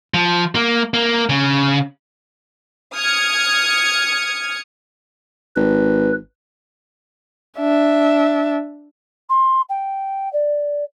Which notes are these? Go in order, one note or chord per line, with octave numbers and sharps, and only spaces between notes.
F3
A#3
A#3
C#3
D#6 F6 G#6 C#7
G#1 B4
D4 E5
C6
G5
D5